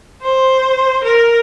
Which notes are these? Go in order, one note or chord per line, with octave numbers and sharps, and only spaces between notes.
C5
A#4